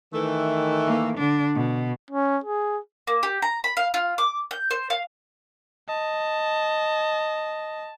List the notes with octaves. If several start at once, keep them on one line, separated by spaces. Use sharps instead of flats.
D#3 E3 A3
A#3
D3 D4
B2
C#4
G#4
A#3
G4
A#5
B5
F5
F4
D6
G6
C5
F5
D#5 A5